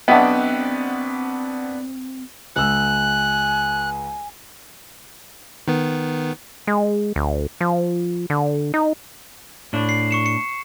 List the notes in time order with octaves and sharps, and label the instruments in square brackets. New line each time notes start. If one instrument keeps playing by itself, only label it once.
[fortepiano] B1 E5 G5 [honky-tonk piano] B3 D4 [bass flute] C4 [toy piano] D#5 F#5
[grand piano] C#2 E6 [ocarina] G#5 [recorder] F#6
[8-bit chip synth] D#3 B3
[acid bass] G#3
D2
F3
D3
D#4
[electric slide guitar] A2 D4
[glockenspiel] C7
C#6 C#7 E7
C#7